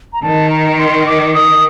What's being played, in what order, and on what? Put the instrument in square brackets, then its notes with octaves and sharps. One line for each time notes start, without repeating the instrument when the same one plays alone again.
[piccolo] A#5
[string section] D#3 [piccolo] A5
[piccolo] A#5
C6
D6
D#6